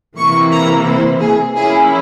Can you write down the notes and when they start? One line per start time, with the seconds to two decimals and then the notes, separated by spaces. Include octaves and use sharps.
0.18 C3 E3 A#3 E4 C#6
0.52 A#5
0.87 C5
1.21 G#4
1.56 F3 A#3 C#4 E4 G#4